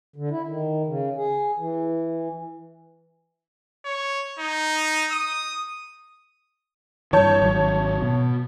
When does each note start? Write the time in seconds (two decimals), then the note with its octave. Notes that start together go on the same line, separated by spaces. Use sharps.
0.16 D3
0.31 E4
0.47 D#3
0.88 C#3
1.17 G#4
1.58 E3
3.85 C#5
4.39 D#4
5.11 D#6
7.13 G2 E3 C#5 A5 G6
7.42 G#1 F#3
8.02 B2